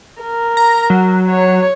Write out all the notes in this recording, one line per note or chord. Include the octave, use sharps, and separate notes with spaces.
A#4
A#5
F#3
C#5